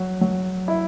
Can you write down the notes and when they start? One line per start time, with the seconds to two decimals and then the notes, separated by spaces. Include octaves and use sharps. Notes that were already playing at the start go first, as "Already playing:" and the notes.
Already playing: F#3
0.21 F#3
0.68 E4